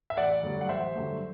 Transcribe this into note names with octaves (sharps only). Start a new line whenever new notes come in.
E5
A1 D5 F#5
G2 D3 F#3 A3
F#5
A1 C5 E5
G2 D3 F#3 A3